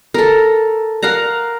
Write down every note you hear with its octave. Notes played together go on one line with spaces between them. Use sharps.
A4 A#4
A#4 F5 F#5 A#5